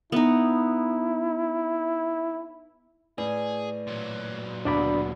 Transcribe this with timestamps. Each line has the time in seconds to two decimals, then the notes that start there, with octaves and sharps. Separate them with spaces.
0.12 B3 D#4 E4
3.18 A2 G#4 B4 D5
3.87 A#2 F#3
4.65 D1 D2 B2 D4 D5 B5